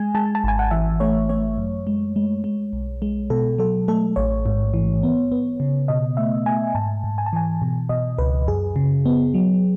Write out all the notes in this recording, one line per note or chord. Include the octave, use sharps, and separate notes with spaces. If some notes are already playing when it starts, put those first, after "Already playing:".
Already playing: G#3 G#5
G#3 A5
A5
G#1 G#5
F#5
E3 E5
A3 C#5
A3 C#5
F#2
G#3
G#3
G#3
B1
G#3
B2 A4
F#3 A4
A3 A4
A1 C#5
G#2
E3
B3
B3
C#3
B2 D#5
A3 E5
A3 G#5
G#2 A5
G#2
G#5
A5
E3 G#5
B2
B2 D#5
C#2 B4
F#2 G#4
C#3
B3
F#3